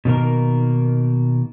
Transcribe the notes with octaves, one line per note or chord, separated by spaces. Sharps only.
B2 D#3 A#3 A#4